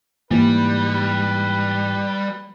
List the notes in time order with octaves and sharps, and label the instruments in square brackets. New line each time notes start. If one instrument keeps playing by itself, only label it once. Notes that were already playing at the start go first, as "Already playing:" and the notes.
[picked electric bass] G#2 E3 [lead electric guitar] G3 [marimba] A#3 [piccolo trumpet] B4